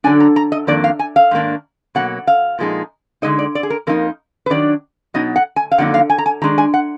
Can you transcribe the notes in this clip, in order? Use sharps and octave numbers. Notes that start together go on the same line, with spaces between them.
D3 F#3 D4 G#5
A#5
A#5
D#5
F2 D#3 A#3 D4 D5
F5
G#5
F5
G#2 D#3 A#3 D4
B2 F#3 A#3 F#5
F5
A#2 F3 G#3 D#4
D3 G#3 D#4 D#5
D5
D5
G#4
A#4
F2 F3 A#3 D#4 A#4
B4
D#3 F#3 D4 D5
B2 F#3 B3 D#4 D#5
F#5
G#5
F5
F2 D3 F#3 A#3 D#4 F#5
F5
G#5
A#5
G#5
D#3 G#3 D4 A#5
G#5
F#5